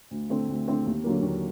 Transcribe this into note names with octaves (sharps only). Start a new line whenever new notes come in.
D2
D3 A3 C4
D2
D3 A3 C4
D#2
D3 F#3 A#3
D#2